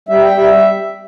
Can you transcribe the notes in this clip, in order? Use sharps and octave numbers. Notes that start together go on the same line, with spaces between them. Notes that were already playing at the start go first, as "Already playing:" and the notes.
G3 E5
G5
G3
E5